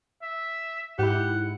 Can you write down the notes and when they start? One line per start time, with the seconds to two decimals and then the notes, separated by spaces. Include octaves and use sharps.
0.22 E5
0.99 G#2 E4 G4 F#5